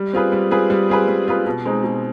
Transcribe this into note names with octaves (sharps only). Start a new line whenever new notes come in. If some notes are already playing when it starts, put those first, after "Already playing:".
Already playing: G3
C4 F4 G#4 B4
G3
C4 F4 G#4 B4
G3
C4 F4 G#4 B4
G3
C4 F4 G#4 B4
B2
G#3 C4 D#4
B2